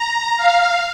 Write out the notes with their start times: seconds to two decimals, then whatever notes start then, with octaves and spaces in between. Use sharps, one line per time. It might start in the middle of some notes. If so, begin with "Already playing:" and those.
Already playing: A#5
0.37 F5